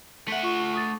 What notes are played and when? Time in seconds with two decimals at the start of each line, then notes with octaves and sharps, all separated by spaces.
0.28 A3 E5 F#5 B6
0.43 F4 C#6
0.74 C#6 D#6 A6